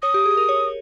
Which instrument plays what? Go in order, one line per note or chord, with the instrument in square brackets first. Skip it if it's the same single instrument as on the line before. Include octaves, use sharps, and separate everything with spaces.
[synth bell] C#5 [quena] D#6
[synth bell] G4
G#4
A#4
C#5